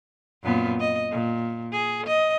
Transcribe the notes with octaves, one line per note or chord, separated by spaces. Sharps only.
F#2 A#2 B3
D#5
A#2
G#4
D#5